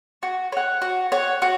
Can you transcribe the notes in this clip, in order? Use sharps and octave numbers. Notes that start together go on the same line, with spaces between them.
F#4
C#5 F#5
F#4
C#5 F#5
F#4